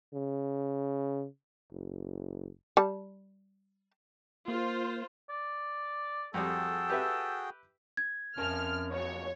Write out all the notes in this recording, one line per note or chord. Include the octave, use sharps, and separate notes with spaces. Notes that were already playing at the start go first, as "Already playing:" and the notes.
C#3
F#1
G3 A5
A#3 F4 C5
D5
F2 G3 F#4 G#4 A4 G5
G4 B4 E5
G#6
F2 C#4 A#4 A5 F6
B2 F3 F#3 C#5